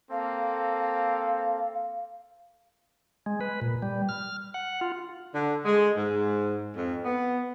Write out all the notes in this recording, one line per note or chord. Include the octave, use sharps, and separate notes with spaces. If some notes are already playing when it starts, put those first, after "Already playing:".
A#3 C4 A4 F5
G#3
B4
A#2
G3
F6
F#5
F4
D3
G#3
G#2
F2
B3